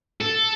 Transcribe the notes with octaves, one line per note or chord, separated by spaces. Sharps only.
A4